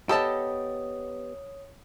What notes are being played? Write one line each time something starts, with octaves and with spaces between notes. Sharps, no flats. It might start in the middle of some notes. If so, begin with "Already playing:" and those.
B3 G4 A4 C#5 D#5 A5 D#6